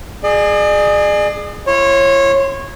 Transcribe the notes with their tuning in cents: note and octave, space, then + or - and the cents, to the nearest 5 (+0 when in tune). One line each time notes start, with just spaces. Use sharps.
G#4 +5 D5 +45
F4 -45 C#5 -20 C6 +0